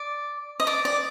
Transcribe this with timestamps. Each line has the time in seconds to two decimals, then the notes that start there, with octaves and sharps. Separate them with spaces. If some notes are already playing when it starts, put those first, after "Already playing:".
Already playing: D5
0.60 D#5
0.67 D5
0.85 D5